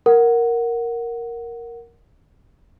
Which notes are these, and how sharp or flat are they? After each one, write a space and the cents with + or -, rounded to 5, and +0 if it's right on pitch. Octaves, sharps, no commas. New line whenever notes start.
A#4 +0 F#5 +0